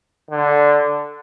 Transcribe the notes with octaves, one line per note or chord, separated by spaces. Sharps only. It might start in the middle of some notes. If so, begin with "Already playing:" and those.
D3